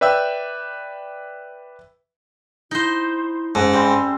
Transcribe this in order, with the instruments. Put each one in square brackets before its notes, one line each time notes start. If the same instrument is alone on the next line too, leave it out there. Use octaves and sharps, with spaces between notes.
[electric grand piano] B4 D5 E5 G5 E6
[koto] D#4 C5 [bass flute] E4
[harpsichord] G#2 [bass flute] C#4 [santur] A4 E5 F#5
[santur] G3 C6 [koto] C4